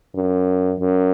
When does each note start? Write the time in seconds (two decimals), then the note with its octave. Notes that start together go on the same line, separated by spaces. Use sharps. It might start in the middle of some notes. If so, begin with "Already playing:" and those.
0.15 F#2
0.80 F#2